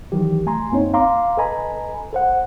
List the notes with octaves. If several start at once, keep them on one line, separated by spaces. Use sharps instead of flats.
D#3 E3 F#3 G4
C2 A3 G#5 A#5 C6
F#2 A#3 C4 D#4 C#5
F5 A#5 C6 D6
A4 B4 D#5 G#5 A#5 B5
A4 C5 F#5